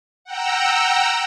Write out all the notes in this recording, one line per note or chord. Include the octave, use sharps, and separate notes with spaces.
F#5 G5 A#5 E6